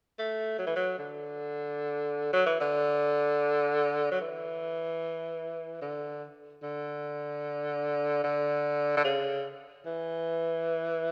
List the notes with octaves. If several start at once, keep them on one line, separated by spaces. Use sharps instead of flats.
A3
F#3
E3
F#3
D3
F#3
E3
D3
F#3
E3
D3
D3
D3
D3
C#3
E3